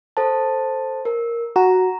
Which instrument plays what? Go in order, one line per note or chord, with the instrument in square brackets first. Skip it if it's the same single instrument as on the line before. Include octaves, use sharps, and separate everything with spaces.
[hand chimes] A4 C5 A5
A#4
[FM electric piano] F#4 [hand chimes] A#5